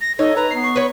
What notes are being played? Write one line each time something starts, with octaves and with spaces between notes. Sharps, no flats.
A#6
D#4 A4 C#5 D#5
B4 A#5
B3 C7
C#6
B4 C#5